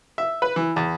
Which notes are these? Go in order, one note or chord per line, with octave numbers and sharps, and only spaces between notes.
E5
B4
E3
E2